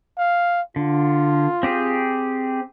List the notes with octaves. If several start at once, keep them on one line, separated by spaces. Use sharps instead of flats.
F5
D3 F4
C4 G4 G#4